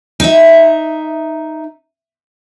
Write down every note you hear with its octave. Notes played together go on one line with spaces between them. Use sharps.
D#4 E5